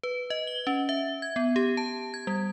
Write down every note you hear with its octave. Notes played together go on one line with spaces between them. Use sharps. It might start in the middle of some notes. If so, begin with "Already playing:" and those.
B4
D#5
G7
C#4
E5
G#6
B3
G4
A5
G#6
G3